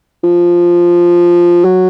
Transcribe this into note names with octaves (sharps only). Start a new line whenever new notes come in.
F3
F#3